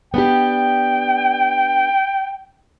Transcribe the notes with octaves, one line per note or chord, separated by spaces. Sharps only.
B3 D4 G4 G5